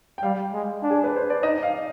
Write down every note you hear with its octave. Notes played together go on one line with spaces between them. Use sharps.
G5
G3 F5
G#3
D4
G#4
B4
C5
D5
D#4 D#5
F5